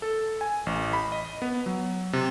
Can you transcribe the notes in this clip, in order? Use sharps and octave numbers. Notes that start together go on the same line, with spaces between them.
A4
G#5
A1
B5
D#5
B3
F#3
C3